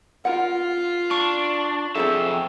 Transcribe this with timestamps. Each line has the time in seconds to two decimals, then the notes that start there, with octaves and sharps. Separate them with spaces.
0.25 F4 A#4 F#5
1.11 D4 C#6
1.95 F2 C4 G#4 A4 E5